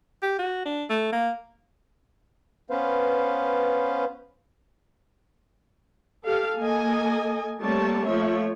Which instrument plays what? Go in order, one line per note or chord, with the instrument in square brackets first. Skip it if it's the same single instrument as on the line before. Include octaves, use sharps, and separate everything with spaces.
[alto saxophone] G4
F#4
D4
A3
A#3
[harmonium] B3 C#4 B4 C5 F5
[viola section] G4 A4 F5
A#3 A4 D#5 G#5
G3 A3 A#3 C4 C#5 A5
F3 A3 C#5 E5